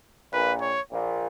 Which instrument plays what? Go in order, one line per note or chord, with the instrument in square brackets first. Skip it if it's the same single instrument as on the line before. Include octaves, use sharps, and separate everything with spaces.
[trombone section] A#1 A#2 [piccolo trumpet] B4
[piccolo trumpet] C#5
[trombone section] A#1 A#2